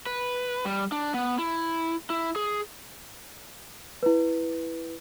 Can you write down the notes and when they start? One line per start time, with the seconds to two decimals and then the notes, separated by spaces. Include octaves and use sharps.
0.06 B4
0.65 G3
0.92 D4
1.14 B3
1.38 E4
2.10 E4
2.36 G#4
4.03 E4 B4